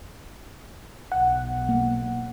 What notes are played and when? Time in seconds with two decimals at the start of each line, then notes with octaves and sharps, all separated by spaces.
1.12 B1 F#5
1.69 A#3